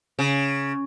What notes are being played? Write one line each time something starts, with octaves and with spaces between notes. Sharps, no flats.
C#3